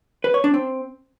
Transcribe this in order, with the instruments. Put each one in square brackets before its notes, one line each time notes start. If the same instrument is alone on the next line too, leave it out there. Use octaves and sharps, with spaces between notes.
[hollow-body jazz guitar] B4
C#5
D4
C4